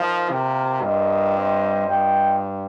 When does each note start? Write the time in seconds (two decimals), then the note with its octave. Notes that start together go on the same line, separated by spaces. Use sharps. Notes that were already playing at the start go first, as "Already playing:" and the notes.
Already playing: F3 D#4 A#4 F5
0.29 C3 A#3 F4 A#4 F5
0.82 G2 F4 A#4 D#5 G5
1.35 G3 C4 F4 C5 D#5
1.88 G2 F4 D#5 G5